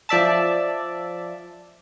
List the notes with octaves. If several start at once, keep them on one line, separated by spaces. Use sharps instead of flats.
F3 D5 E5 A5